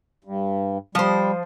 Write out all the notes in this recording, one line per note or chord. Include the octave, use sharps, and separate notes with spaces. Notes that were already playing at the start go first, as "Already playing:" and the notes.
G2
F3 G3 C5